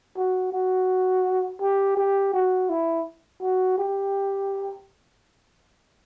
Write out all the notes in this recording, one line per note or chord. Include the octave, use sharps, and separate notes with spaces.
F#4
F#4
G4
G4
F#4
E4
F#4
G4